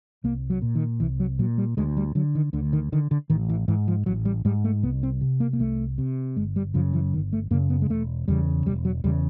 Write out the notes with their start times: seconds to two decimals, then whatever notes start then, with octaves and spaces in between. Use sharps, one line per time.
0.24 C2 A#3
0.50 F#3
0.62 A#2
0.75 D#3
1.00 C2 E3
1.20 F#3
1.39 A#2 F#3
1.58 G3
1.77 D2 G#3
1.97 G3
2.15 D3 F#3
2.35 D#3
2.53 D2 D3
2.73 D#3
2.92 D3 D#3
3.11 D3
3.30 A1 D#3
3.49 E3
3.68 G#2 E3
3.88 F3
4.06 A1 F#3
4.25 G3
4.45 G#2 G3
4.64 A3
4.83 C2 B3
5.03 C4
5.21 C3
5.40 A#3
5.53 A#3
5.59 C2 A3
5.98 C3
6.36 G1 G#3
6.56 G3
6.74 F#2 C#3 F3
6.93 E3
7.14 G1 D#3
7.33 A3
7.51 F#2 C#3 A#3
7.70 B3
7.82 G#3
7.90 E1 A3
8.28 E2 C#3 G3
8.66 E1 G3
8.85 F#3
9.04 E2 C#3 G3